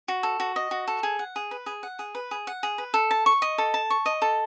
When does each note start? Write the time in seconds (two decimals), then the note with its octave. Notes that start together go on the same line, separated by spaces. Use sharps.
0.08 F#4
0.23 A4
0.40 F#4
0.56 D#5
0.71 F#4
0.88 A4
1.03 G#4
1.19 F#5
1.36 G#4
1.51 B4
1.66 G#4
1.83 F#5
1.99 G#4
2.15 B4
2.31 G#4
2.47 F#5
2.63 G#4
2.78 B4
2.94 A4
3.11 A5
3.26 C#6
3.42 D#5
3.58 A4
3.74 A5
3.90 C#6
4.06 D#5
4.22 A4